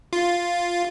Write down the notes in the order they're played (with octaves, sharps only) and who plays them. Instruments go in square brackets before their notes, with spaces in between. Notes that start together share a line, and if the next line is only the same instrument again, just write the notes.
[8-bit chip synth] F4